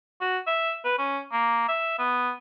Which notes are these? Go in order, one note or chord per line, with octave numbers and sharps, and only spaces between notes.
F#4
E5
B4
C#4
A#3
E5
B3